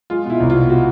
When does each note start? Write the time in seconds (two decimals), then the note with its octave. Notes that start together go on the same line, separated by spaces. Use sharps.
0.10 G#3 F4
0.25 B2 E4
0.40 C2
0.50 F4
0.55 B2
0.70 F#4